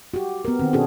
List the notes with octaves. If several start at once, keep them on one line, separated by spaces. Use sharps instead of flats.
F#4 G4
B3 A#4
D#3 C4
B2 C#4 D4 F#4 G#4 A4